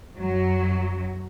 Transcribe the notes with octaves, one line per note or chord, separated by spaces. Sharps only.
F#2 F#3